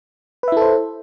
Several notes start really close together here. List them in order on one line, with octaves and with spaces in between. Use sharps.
B4 E5 E4 A4 C5